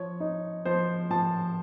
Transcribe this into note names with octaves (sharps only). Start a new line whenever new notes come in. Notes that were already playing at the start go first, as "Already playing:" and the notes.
Already playing: F3 C#5
D#4
F3 C5
F3 A5